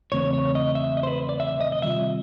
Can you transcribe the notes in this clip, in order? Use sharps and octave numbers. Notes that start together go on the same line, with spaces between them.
E2 C#3 E3 A3 C4 C#5
C#5
D#5
E5
D#5
C5
B4
D5
E5
D#5
D#5
C3 D#3 G3 C4 F4 E5